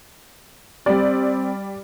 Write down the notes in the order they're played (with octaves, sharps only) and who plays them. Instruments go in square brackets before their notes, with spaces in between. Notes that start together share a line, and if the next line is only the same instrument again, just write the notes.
[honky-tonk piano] G3 D5 [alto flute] C4